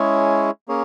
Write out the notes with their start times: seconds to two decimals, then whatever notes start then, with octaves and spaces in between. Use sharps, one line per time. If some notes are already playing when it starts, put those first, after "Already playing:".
Already playing: G#3 C#4 E4 G#4 C#5
0.68 A#3 C#4 G#4 C#5